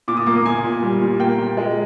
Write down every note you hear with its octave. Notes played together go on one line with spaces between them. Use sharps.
A#2 D6
D#6
A#3 D6
A#2 G#5
A#2
G3
A#2
A#3 G5
A#2
G#3